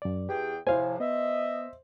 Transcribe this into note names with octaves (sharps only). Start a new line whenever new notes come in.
F#2 D5
E2 G4 G#4 G5
A2 C3 F3 E4 C5 F5 G#5
B3 D#5 E5